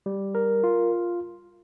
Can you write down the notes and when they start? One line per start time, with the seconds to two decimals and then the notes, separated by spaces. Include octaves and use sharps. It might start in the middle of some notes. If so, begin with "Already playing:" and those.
0.06 G3
0.35 A#4
0.64 F4